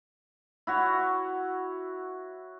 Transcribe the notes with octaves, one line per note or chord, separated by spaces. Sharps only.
E4 F#4 C#5